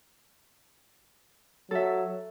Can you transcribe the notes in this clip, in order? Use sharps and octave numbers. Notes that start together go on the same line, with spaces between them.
F#3 A4 E5